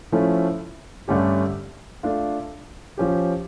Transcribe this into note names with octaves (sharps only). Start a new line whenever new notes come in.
F3 A3 C#4 E4
G2 D3 A3 C#4 G4
A3 D4 F4
F3 C#4 G4